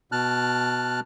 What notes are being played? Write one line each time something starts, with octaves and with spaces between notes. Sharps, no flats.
B2 A5 F6 F#6